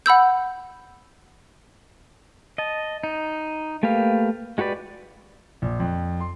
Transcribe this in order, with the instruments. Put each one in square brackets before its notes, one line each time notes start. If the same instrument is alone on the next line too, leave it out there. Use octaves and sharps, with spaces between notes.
[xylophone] F#5 B5 E6 G6
[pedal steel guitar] D#5 A5
D#4
A3 A#3 G4 B4 F5
G#3 F#4 G4 B4 D5
[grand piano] A#1
F2
C6